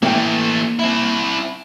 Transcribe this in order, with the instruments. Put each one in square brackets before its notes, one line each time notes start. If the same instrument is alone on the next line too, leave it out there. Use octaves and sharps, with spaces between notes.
[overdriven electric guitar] E3 A3 [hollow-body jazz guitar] A#3 E5 G5
[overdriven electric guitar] C4 E4